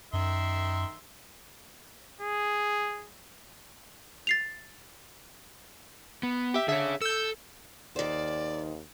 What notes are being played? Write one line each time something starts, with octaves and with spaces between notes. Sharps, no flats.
F#2 D#3 E5 C6
G#4
A6 C7 F7
B3
G4 E5
D3 G#4 C#5 E5
A4 E6 G6
D#2 D#3 C5 D5